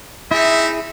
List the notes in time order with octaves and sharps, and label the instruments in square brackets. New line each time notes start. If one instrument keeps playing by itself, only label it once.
[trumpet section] C4 D#4 [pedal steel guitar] E4 G#4 [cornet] E5